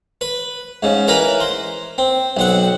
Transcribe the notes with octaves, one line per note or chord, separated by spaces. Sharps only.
B4
G#2 C#3
E3 A#4 B4 A#5 B5
C5
C4
B1 C4 F#5